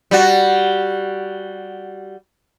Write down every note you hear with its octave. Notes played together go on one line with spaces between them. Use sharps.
G3 F#4